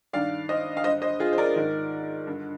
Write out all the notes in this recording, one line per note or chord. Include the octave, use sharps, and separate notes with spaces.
G2 D#3 D5 F5
C5 D#5
F5
G2 D3 C5 D#5
C5 D#5
F4 G#4
C5
A#4 D5
G#2 D#3
G2 D3